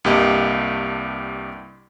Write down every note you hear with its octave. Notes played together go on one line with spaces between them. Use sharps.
C2 G2 A#3 G4 D#5